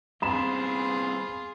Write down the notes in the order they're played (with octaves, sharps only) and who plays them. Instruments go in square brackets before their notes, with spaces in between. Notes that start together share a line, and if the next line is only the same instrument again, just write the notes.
[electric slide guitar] G3 B3 C4 [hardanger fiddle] F4 G#4 [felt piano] B5 E7